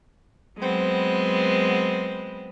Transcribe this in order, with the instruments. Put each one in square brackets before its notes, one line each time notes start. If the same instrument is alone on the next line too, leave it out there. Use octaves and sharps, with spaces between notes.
[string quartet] F#3 G#3 B3 C4